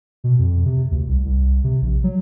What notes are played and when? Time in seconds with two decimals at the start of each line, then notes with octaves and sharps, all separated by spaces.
0.24 B2
0.39 F2
0.65 C3
0.91 D2
1.08 C2
1.25 C2
1.64 C3
1.82 A#1
2.04 F#3